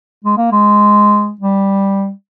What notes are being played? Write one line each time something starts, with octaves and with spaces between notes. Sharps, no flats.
G#3
A#3
G#3
G3